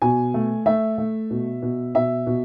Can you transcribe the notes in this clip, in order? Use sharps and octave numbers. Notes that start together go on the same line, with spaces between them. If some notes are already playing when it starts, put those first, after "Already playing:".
B2 G#5
A3
A3 E5
A3
B2
B2
B2 E5
B2